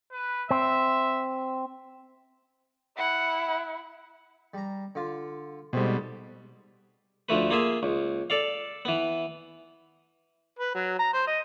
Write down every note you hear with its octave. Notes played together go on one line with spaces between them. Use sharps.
B4
C4 E5
E4 F#5
G3 A#5
D3 F4
G#2 B2 G3 A3 C4
D2 F3 A3 B4
A#3 F4 G#4 E5
C#2
A4 D5 F5
E3 B3
B4
F#3
A#5
C5
D#5